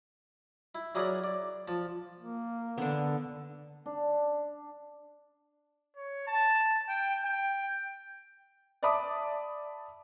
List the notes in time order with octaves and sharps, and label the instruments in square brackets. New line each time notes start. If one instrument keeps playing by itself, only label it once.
[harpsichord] E4
F#3 E4 G#4 A#4 D5 F#5
D5
F3 A5
[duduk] A#3
[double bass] D3 [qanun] B3 D4
[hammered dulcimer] D4
[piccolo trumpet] C#5
A5
G5
G5
[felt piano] D5 E5 A5 B5 D6 D#6